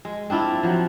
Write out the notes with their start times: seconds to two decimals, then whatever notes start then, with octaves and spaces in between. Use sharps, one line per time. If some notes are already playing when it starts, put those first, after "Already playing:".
0.05 G#3
0.30 C4 D4 E4 F4
0.63 F3 F#3